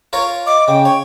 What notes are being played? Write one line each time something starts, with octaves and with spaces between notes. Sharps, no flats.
F4 A#4 C#5
D#5 D6
C#3 G5
C#5